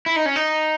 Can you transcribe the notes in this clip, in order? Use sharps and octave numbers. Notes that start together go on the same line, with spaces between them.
E4
D#4
C#4
D#4